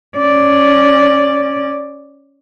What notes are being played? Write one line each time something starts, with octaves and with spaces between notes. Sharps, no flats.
C#4 D5